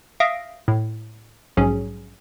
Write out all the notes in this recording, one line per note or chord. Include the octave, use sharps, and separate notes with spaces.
E5 F5 D#6 A#6 D7
A2
A#1 G#2 F#3 C#4 G#4